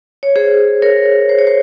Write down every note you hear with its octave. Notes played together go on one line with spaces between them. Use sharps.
C#5
G#4 C5
A#4 C#5
C5
C#5
C5